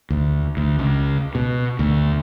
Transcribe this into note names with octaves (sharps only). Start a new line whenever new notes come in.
D2
D2
C#2
B2
D2